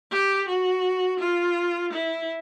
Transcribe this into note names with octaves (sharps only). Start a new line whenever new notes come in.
G4
F#4
F4
E4